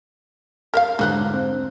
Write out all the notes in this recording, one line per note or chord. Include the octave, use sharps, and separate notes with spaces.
A#4 E5 F5 F6
G#2 D3 E3 F#3 D#4 F#6
C4